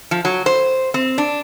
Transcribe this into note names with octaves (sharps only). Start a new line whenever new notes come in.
F3
F#3
C5
C4
D4